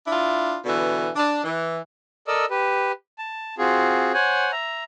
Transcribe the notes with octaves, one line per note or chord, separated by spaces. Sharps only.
D4 E4 F4
B2 D3 E3
D4
E3
A4 A#4 D5 D#5 E6
G4 B4
A5
C4 F4 F#4 G#4
C5 C#5 F#5 G#5
E5 A#5